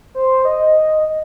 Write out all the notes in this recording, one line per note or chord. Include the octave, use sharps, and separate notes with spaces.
C5
D#5